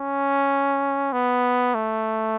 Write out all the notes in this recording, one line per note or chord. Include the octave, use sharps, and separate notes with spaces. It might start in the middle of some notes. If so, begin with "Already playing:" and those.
Already playing: C#4
B3
A3